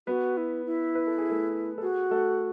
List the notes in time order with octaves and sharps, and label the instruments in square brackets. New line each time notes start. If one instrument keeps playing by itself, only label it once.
[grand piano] B3 B4 [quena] F#4
[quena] E4
E4
[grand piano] B4
A4
G#4
A3 A4
A4
[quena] F#4 [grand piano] G#4
[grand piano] A3 A4